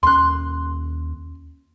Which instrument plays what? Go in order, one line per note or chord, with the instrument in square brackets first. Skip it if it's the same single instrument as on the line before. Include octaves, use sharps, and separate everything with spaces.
[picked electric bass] D#2 B3 C#4 [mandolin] C6 F#6